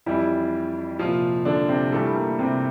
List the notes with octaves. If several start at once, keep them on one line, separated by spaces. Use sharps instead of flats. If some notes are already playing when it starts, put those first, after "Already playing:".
F2 E3 G3 E4
C2 A#2 F3 F4
D3 D4
C3 C4
G2 E3 G3 A3
A#3
C3 C4